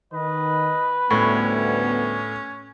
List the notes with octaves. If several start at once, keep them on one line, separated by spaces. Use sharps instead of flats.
D#3 B4 D#5
D2 A2 G3 B3 C#4